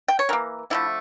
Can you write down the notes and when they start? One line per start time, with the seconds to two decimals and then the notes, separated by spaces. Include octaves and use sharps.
0.08 G5
0.19 C#5
0.29 E3 A#3 A#4
0.70 D3 F3 A3 E4